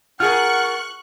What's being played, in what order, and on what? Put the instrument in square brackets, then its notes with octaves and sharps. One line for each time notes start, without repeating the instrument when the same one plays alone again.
[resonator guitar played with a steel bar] F4 G#4 A#4 [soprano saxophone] F#5 [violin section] C#6 F#6 [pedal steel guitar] F6